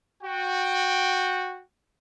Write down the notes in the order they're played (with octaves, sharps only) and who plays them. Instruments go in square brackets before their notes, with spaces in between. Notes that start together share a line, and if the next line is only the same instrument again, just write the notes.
[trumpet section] F#4 G5